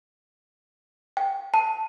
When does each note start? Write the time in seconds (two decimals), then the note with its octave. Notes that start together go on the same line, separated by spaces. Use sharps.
1.17 G5
1.54 A5